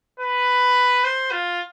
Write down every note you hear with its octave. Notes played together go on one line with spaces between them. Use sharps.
B4
C5
F4